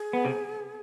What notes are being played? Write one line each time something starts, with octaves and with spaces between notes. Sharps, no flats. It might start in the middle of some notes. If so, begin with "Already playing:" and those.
Already playing: G#4
B3
C3 C4